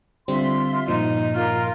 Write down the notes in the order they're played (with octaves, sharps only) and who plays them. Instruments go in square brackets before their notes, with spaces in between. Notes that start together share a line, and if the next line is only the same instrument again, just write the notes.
[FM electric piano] D3 G3 C4 [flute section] F4 E5 C6
[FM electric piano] G2 A#2 F3 [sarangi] D#4
[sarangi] F4 [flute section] A#4